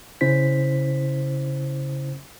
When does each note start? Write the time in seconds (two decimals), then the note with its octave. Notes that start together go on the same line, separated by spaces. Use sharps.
0.21 C#3 C#4 E4 C5 B6